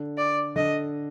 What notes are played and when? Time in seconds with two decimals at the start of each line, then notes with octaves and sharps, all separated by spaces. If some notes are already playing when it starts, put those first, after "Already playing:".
Already playing: D3
0.18 D5
0.56 D3 D#5